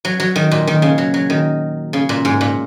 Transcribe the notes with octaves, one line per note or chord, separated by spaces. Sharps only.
F#3
F#3
D#3
A#2
D#3
C#3
F#3
F#3
D#3
C#3
A#2
G#2
A#2